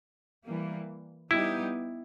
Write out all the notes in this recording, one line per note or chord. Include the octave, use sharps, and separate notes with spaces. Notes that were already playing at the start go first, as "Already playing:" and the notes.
E3 G3 A#3
G3 B3 D#4 E4 G4